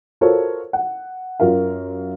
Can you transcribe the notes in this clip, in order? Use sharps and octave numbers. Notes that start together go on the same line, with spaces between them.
F4 F#4 A4 A#4 C5 C#5
F#5
F#2 F4 A#4 F5